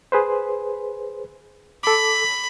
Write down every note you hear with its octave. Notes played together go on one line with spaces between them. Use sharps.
G#4 B4 C5
A4 B5 D6